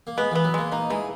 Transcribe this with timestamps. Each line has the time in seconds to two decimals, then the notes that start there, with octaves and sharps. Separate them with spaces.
0.07 A#3
0.17 G#3 B3
0.31 E3 B3
0.44 F#3
0.54 G#3 A#3
0.72 A#3 D#4
0.90 E3 G#3